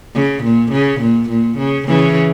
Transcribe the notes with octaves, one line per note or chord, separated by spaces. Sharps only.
C#3
A#2
C#3
A#2
A#2
C#3
C#3 E3